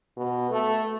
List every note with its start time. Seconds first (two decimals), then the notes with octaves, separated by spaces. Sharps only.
0.17 B2
0.50 A3